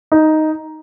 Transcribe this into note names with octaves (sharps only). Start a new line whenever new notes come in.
D#4